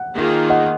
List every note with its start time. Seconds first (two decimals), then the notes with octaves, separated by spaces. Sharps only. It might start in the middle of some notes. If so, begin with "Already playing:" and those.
Already playing: F#5
0.14 D#3 A#3 F4 G#4
0.50 D#5 F#5